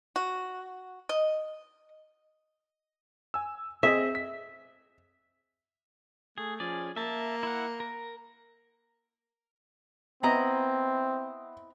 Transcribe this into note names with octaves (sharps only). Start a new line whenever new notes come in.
F#4
D#5
G#5 E6
C4 G#4 D#5 E5
B6
A3 G#4
F3 C#4 G#4 D5
A#3 E5 A5
E4 F#5
A#4
B3 C4 E4 D#5 A#5